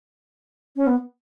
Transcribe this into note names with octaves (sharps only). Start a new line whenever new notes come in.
C#4
B3